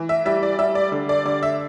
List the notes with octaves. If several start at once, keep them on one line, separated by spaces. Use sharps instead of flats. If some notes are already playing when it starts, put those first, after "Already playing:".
Already playing: E3
E5
G3 E5
D5
G3 E5
D5
D3
D5
D3 D5
E5